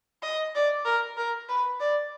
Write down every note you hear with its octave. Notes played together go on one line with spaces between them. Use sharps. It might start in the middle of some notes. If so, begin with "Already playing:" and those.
D#5
D5
A#4
A#4
B4
D5